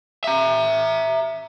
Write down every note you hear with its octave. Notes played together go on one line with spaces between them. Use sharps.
E5 A#5